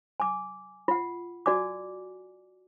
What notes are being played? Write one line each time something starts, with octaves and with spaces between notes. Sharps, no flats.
G#5 D6
F4 F#5
F#4 D5 G#5 D6